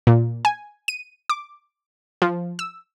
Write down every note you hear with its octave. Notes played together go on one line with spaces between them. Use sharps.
A#2
G#5
D#7
D6
F3
E6